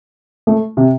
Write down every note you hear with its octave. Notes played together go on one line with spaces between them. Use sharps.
A3
C3